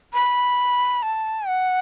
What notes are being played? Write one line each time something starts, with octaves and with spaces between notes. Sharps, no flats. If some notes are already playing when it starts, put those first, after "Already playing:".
B5
A5
F#5